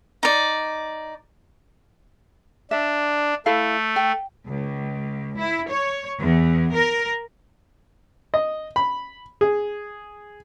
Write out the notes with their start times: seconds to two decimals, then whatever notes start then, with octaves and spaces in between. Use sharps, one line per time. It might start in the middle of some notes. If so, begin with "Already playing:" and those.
0.23 D#4 D5
2.71 D4 E5
3.46 A3 E4 A4 F5
3.96 G5
4.46 C#2
5.38 E4
5.68 C#5
6.21 E2
6.75 A#4
8.34 D#5
8.76 B5
9.41 G#4